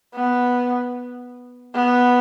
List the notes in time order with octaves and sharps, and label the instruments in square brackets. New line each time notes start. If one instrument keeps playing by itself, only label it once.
[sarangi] B3
B3